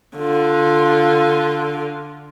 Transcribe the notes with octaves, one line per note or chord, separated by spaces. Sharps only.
D3 F4